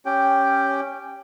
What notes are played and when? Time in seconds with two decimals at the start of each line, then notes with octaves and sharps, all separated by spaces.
0.06 C#4 G4 G5